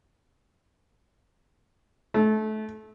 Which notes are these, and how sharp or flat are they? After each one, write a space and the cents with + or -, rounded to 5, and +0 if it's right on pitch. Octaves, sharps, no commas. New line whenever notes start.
A3 -25